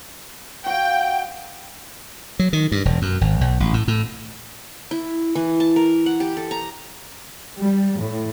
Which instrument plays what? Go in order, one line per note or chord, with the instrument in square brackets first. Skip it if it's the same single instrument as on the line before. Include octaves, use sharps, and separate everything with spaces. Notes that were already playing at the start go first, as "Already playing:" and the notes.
[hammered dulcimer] F#4 F5 [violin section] G5
[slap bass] F#3
D#3
G2
E1
F#2
G#1
B1
A1
A2
A2
[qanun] E4
E3
A5
A#4
F#5
G4
A4
A#5
[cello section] G3
A2